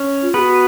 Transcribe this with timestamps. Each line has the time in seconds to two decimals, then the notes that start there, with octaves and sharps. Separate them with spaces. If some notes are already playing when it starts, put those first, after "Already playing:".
Already playing: C#4 C#5
0.23 F4
0.34 B3 G#4 B4
0.39 F#4